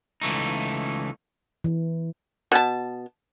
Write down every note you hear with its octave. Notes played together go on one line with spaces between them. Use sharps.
C#2 E3 A3 D#4
E3
B2 A5